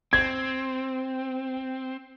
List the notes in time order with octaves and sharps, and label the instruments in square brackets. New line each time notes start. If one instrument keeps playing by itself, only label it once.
[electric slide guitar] C4 [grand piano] G#6